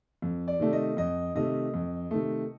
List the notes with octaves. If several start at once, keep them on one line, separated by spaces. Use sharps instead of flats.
F2
D5
C3 D#3 A3
D#5
F2 D#5
C3 D#3 A3 D#5
F2
C3 D#3 A3